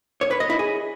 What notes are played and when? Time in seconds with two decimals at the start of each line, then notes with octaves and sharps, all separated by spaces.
0.21 C#5
0.31 B4
0.40 D#5
0.50 E4
0.59 G#4